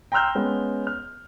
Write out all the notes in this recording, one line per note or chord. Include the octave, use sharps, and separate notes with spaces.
G5 A#5 C6 E6 F6 G6
G#3 B3 C#4
F6